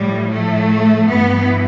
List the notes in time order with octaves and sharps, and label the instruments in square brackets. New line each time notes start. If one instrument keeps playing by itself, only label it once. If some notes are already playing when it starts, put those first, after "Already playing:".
Already playing: [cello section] A2 F3 G3
A3
G2 E3 B3